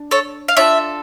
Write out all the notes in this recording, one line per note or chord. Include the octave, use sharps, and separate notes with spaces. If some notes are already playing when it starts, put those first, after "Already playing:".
Already playing: D4
A4 C#5
F5
D4 F4 A4 C#5 E5